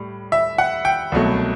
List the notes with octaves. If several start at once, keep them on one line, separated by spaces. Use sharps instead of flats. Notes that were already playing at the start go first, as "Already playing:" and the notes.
Already playing: A2 G3
E5
F#5
G5
C2 B2 F#3 A3